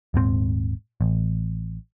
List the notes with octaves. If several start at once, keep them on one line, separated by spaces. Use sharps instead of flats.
D#1 G#2 A#3 C4
A1